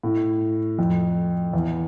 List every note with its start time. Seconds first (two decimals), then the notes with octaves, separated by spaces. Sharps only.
0.03 A2
0.79 F2
1.53 E2